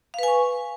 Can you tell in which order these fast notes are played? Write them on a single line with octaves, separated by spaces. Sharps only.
F5 B4 G#5 C#6